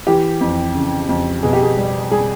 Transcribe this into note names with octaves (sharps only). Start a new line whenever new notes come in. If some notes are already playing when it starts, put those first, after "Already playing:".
E3 G4
F2
C#3
F2
B2 G#4
G4
G#4
G3
G3 G#4